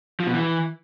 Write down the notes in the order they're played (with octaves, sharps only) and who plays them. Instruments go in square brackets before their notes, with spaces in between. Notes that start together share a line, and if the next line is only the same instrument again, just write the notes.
[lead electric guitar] F3
B2
E3